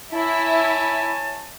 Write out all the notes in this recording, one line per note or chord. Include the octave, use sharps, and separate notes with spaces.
E4 C#5 G#5 A5